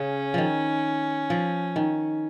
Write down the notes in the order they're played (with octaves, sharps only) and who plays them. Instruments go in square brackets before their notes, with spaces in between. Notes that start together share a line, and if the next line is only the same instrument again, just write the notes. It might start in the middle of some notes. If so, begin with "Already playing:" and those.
Already playing: [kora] C#3 [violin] C#4
[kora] D#3 F3
F3
D#3